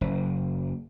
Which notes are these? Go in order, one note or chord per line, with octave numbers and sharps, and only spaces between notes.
F#1